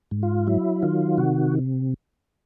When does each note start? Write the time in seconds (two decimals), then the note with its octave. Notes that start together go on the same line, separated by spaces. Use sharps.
0.11 G#2
0.23 F4
0.47 F#3 E4
0.83 D#3 F4
1.18 C3 F#4